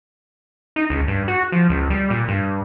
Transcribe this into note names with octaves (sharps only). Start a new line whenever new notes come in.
D#4
C#2
G2
F#4
F3
C#2
G3
A#2
G2